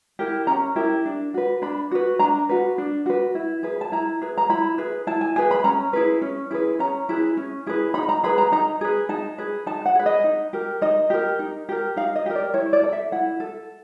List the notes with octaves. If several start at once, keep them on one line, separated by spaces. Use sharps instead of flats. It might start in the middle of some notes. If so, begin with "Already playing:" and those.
E4 G4 A#4
C#4 A#5
E4 G4 A#4
D4
F#4 B4
D4 B5
F#4 B4
D4 A#5
F#4 B4
D4
F#4 B4
E4
G#4 B4
A5
E4 A#5
G#4 B4
A#5
E4 B5
G#4 B4
E4 A5
G#5
G#4 B4 G#5
B5
C#4 A#5
E4 G#4 B4
C#4
E4 G#4 B4
C#4 A#5
E4 G#4 B4
C#4
E4 G#4 B4
D#4 B5
A#5
G#4 B4 B5
A#5
D#4 A#5
G#4 B4
D#4 A5
G#4 B4
D#4 A5
F#5
G#4 B4
D#5
D#4
G4 A#4
D#4 D#5
G4 A#4
D#4
G4 A#4
D#4 F5
D#5
G4 A#4
D5
E4 C#5
D5
A4
E5
E4 F#5
A4